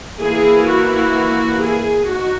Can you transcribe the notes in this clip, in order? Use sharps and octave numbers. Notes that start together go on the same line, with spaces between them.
E3 A#3 E4 G#4
F#4
G#4
D#4 F#4